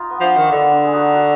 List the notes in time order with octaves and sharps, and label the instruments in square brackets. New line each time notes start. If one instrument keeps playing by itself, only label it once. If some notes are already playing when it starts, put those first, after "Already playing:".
Already playing: [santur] D#4 F4
B3
[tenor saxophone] F3 [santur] D4
[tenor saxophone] D#3 [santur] A#3
[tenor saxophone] D3 [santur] B3
[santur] D4
G#4
D#4 F#4
F#4 A#4